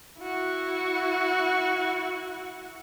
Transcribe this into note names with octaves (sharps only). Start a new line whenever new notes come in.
E4 F#4